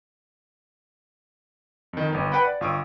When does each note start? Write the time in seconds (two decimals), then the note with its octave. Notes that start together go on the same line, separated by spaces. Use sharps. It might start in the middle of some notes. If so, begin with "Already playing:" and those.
1.93 F2 D#3
2.12 G1 B3
2.32 B4 F#5 G5 B5
2.44 D5
2.61 G1 F4 C#6 D#6 E6 D7